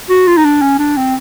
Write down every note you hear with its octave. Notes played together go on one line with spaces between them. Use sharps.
F#4
F4
D#4
D4
C#4
D4
C4